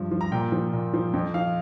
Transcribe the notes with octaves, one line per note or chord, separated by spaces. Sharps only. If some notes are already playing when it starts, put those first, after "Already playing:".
Already playing: G2 F3
F3
A#5
A#2 G5
F3
A#2
F3
F2 G5
F3 F5